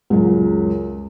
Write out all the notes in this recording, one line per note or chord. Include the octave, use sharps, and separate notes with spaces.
C#2 F#2